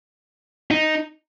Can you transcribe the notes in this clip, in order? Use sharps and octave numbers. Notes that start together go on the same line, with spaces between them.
D#4